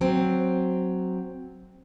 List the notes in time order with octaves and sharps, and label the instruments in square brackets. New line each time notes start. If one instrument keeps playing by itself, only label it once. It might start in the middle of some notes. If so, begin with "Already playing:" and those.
[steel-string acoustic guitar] F#3 C4